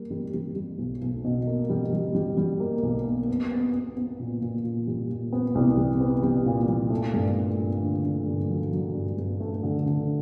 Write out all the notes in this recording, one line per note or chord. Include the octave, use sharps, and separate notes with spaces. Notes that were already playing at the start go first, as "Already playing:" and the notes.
Already playing: G3 A#3
G3
G3
G3
B1
B1
B2
A#3
G3
G3
G3
G3
A#3
B1
A#3
B3
B3
B3
B3
A#2
A#2
A#2
G3
A#2
B3
C2
G3
B3
G3
A#2
G3
A3
G2
A3
G2
D3
D3
G2
F#3
F#3
G2
G2
A3
D3
D3